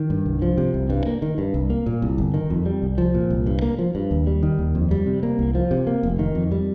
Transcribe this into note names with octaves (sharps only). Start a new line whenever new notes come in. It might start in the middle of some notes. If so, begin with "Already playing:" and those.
Already playing: D#3
G2
C2
F3
C3
C2
G2
A#3
D#3
G2
C2
A#3
A#2
C2
G1
D#3
F2
G3
C2
F3
A#2
C2
G2
A#3
F3
G2
D#2
G3
D#3
D#2
F2
G3
C3
A#3
C2
F3
C3
A#3
F1
D#3
F2
G3